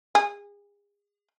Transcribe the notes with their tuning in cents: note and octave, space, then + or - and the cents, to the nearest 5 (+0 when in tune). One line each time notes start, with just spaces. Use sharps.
G#4 -30